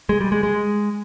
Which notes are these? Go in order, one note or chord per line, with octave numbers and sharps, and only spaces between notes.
G#3
G3
G#3
G#3